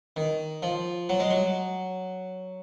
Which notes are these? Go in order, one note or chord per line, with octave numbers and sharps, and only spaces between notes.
D#3
F3
F#3
G#3
F#3